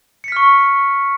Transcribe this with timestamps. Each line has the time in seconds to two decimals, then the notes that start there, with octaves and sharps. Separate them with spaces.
0.24 C#7
0.28 B6
0.32 F6
0.36 C#6